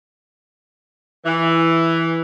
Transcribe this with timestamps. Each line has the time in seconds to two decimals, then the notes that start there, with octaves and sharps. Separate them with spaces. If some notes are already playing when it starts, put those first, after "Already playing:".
1.26 E3